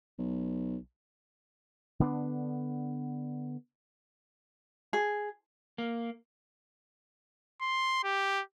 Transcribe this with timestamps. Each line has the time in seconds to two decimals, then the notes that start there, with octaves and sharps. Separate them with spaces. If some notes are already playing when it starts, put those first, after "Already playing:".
0.19 B1
2.00 D3 B3 D4
4.93 G#4
5.78 A#3
7.61 C6
8.04 G4